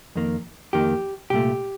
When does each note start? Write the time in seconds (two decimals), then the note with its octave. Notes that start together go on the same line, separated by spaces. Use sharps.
0.16 F2 D#3 A#3
0.73 F2 D#3 A#3 G4
1.30 C2 A#2 A3 G4